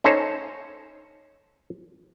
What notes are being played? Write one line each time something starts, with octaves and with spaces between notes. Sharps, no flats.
C#4 D#4 A4 C5 C#5